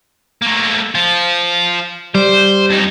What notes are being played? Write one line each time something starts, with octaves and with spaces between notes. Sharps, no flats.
A3 A#3
F3 F4
G3 C5
F2 D#4